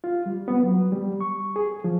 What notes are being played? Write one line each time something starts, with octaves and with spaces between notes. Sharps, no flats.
F4
G3
B3
F#3
G3
C#6
G#4
F3